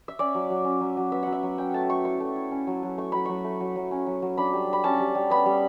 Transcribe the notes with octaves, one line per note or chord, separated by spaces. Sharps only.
E5
C#4 D5
F#3
F#3
C#4
F#3
F#3
B3 E5
F#3 F#5
E5
F#3
C#4 G5
A3 A5
A3 C#6
E4 C#6
A3
E4
C#4
F#3
F#3
A3 C#6
F#3 B5
F#3 C#6
A3
F#3
F#3
C#4
F#3
F#3
D4 B5
G3
D4 B5
C#4 A5
G3
G3
B3 B5
G3